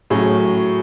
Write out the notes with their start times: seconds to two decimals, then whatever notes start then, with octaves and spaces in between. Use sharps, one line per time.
0.10 A2 F#3 C#4 G#4